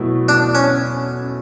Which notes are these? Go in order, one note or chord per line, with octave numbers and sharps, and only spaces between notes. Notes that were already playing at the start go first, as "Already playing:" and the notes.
Already playing: B2 F#3 A3 E4
D4
C#4